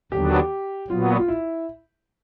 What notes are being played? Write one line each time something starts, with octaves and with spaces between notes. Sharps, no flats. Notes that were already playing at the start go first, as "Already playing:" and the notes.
D#2 D3 F#3 B3 D4 G4
A#2 F#3 B3 F4
F4
E4